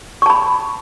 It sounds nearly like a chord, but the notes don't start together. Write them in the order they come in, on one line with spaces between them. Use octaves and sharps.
C#6 A5 B5